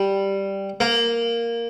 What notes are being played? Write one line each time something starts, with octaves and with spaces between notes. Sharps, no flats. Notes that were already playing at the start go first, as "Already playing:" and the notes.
Already playing: G3
A#3